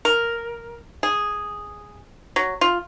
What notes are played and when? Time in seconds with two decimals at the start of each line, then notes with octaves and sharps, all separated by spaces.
0.05 A#4
1.03 G#4
2.36 F#3
2.61 F4